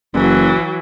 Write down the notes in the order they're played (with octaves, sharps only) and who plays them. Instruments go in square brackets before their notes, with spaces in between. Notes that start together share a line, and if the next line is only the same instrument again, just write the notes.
[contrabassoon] F#1 [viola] E3 F#3